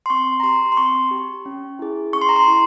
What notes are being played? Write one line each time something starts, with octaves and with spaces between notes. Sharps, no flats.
C6
C4 C#6
A#5
G4 C6
C6
C4 C#6
G4
C#4
E4 G#4
C#4 C#6
C6
A#5
C6
E4 G#4